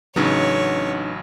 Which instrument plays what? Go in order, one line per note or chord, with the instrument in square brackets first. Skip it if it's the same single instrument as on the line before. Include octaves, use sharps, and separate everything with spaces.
[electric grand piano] A1 C#3 F#3 [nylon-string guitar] B3 D4 D#4 [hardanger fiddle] C#5